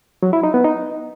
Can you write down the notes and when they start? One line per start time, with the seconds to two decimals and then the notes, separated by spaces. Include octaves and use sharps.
0.23 F#3
0.33 E4
0.44 D#4
0.54 B3
0.64 D#4